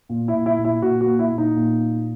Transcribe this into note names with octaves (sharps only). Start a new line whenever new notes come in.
A#2
E4
A#2
E4
A#2
E4
A#2 F#4
F#4
A#3
E4
A#2
D#4
A#2
A#3